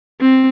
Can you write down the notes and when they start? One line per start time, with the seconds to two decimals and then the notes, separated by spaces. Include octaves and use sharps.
0.21 C4